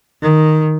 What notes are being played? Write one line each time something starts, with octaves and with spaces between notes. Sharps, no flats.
D#3